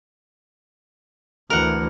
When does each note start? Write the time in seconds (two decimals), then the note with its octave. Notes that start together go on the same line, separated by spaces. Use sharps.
1.50 D2 E3 A#4 F#5